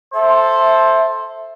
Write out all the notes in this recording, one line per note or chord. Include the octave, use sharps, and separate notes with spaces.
A4 C5 E5